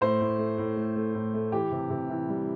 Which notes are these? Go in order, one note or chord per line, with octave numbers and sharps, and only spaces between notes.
A2 C5
A2
A3
A2
A3
A3
A2
A3
E3 G4
C3
C3
E3
G3